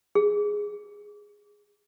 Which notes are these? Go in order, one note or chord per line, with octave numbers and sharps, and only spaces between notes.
G#4